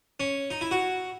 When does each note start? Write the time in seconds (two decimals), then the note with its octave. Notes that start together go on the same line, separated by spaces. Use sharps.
0.20 C#4
0.50 D#4
0.61 E4
0.71 F#4